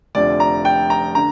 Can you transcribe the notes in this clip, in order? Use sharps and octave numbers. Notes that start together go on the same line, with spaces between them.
F1 F2 D3 D5
A#5
G5
A#5
D3 A#5